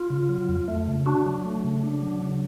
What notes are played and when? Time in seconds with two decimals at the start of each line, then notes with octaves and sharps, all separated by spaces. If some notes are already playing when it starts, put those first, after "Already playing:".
Already playing: F4
0.10 C#3
0.29 F#3
0.49 F2
0.68 A3
0.87 C#3
1.06 D4 F#4
1.26 F#3
1.45 A3
1.64 C#3
1.83 D4
2.02 F#3
2.21 C#3